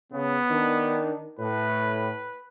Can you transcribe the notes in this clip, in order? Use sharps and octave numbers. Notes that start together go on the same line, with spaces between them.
C#3 B3
D#3 D4
A2 B4